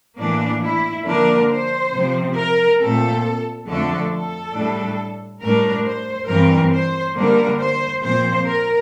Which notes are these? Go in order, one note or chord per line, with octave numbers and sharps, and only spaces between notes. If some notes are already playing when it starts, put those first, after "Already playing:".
A2 E3 A#3 D4
E4
D3 F3 A#3 D4 A#4
C5
C3 F3 C4
A#4
A#2 A3 C4 A4
F2 D3 A3 D4 A4
A4
A2 G3 D4
A2 G3 D4 A#4
C5
G2 E3 G3 C4 A#4
C5
D3 G3 A#3 D4 A#4
C5
A#2 F3 C4 C5
A#4